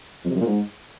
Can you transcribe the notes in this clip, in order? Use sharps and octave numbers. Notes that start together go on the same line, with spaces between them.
F2
C3
F#2
A#2
G#2